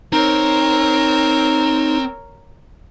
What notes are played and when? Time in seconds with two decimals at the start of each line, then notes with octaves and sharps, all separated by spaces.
0.12 C4 D#4 A#4 C#5